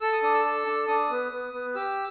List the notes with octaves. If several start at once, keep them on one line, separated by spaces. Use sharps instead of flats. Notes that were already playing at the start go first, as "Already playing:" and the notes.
A4 E6
D#6
D4 D#6
E6
A4
D4
D4 D#6
B3
B3
B3
G4 E6